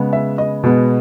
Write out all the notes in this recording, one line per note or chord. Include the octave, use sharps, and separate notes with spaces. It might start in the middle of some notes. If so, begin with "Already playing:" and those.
Already playing: C#3 G#3 B3
E5
D#5
B2 G#3 B3